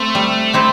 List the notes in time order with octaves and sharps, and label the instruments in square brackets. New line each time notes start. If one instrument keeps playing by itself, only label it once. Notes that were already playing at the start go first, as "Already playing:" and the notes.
Already playing: [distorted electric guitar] A3 [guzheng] C4 C5
[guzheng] G3
C4 E4 G4 C5